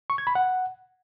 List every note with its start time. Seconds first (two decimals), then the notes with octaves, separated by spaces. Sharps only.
0.10 C#6
0.18 G#6
0.27 B5
0.35 F#5